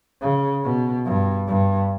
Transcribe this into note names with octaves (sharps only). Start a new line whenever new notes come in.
C#3
B2
G2
G2